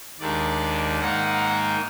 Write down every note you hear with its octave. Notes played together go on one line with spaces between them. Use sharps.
D#2 D#3 G#3 D4 D5
G#2 D#3 A#3 D#4 F#5